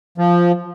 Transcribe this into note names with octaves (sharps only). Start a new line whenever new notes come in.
F3